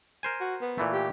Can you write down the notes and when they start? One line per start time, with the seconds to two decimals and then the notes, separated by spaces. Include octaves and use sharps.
0.23 A#4 C5 G#5
0.41 F#4
0.61 B3
0.78 A#2 E3 A3
0.93 G4